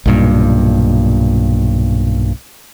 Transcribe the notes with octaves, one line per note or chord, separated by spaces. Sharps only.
B1 G2 A#2